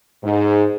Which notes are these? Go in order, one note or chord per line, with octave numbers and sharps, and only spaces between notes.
G#2